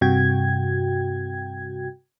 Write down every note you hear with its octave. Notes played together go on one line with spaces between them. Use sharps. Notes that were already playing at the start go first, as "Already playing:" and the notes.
G2 C3 F#4 G5 G#6